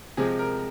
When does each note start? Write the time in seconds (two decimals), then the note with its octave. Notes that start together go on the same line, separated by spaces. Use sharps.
0.17 C3 F3 G#3 G#4
0.39 A#4